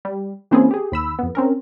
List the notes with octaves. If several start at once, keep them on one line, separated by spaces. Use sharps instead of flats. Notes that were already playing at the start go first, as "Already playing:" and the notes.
G3
E3 A#3 C4 C#4 E4 G#4
G4 G#4
D#2 B5 E6
F2 B3
C4 C#4 A#4